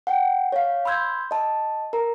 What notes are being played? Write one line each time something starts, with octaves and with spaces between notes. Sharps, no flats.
F#5 G5
C#5 F5
B5 C6 E6 G6 G#6
D#5 A5
A#4 A#5